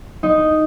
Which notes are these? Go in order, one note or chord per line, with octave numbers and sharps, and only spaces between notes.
D#4